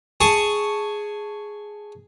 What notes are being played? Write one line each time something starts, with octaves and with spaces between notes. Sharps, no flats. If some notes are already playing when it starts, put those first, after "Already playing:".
G#4 A5 C#6